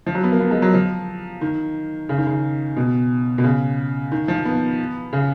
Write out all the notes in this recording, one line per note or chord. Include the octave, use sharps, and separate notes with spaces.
F3
F#3
B3
A#3
B3
G#3
F#3
F3
D#3
C#3
D#3
C#3
B2
B2
C#3
D#3
F3
B3
C#3